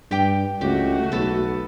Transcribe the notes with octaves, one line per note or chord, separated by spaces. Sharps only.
G2 G4 G5
C#2 A3 F#4 G4
B1 B3 A4